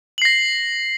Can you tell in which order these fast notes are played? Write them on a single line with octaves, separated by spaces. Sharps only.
F#7 C7 A#6